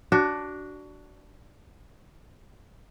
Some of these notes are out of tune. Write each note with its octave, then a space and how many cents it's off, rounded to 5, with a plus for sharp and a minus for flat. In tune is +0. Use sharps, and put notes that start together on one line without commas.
D4 +0 F#4 +20